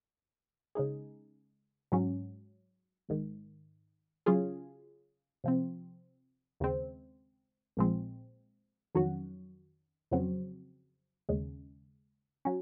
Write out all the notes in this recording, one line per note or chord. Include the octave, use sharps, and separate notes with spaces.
C#3 G#3 D#4 G#4
G#2 F#3 C#4
G#1 G#2 D#3
C#3 F#3 C#4 F4 G#4
C3 F3 C4
D#2 C#3 G#3 C4
A#1 A#2 F3 G#3 C4
F2 D#3 F#3 C#4 F#4
F2 C#3 F#3 C4 F#4
D#2 C#3 G#3
F#3 C#4